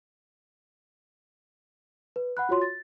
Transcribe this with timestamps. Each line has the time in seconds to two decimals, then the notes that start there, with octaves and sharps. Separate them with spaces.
2.16 B4
2.37 F#5 B5 F#6
2.49 F4 F#4 C#5 C6
2.62 A6